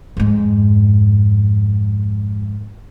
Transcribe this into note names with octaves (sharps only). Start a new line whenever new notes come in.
F2 G#2